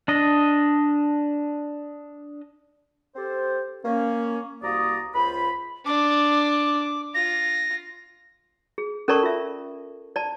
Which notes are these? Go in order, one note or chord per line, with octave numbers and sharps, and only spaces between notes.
D4 D#5
C4 G4 A4 C5
A#3 C#4
C2 A#3 F#4 D5 A#5 D#6
C#2 F4 C5 B5
D4 D6
F4 A#6
G#4
C#4 A4 A#4 D5 A5 C#6
F4 E5
D5 A5